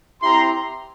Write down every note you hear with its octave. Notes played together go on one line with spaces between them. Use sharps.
C4 E4 G4 A#5 C6